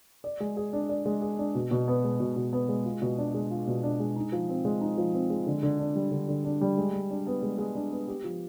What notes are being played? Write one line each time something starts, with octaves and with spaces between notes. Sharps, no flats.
D5
G#3
G#4
D4
D5
G#3
G#4
D4
B2
B2
B3
G#3
B2
B2
B3
G#3
F4
B2
D4
G#3
F4
B2
D4
G#3
D#4
F3
C4
G#3
D#4
F3
C4
G#3
D3
D3
D4
G3
D3
D3
D4
G3
G#3
G#3
D4
B3
G#3
G#3
D4
B3
G4
F3